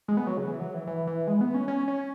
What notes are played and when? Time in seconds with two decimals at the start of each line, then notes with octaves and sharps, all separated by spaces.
0.08 G#3
0.17 B3
0.27 F#3
0.37 C#3
0.47 E3
0.60 F#3
0.74 E3
0.87 E3
1.07 E3
1.27 G#3
1.41 B3
1.54 C#4
1.68 C#4
1.88 C#4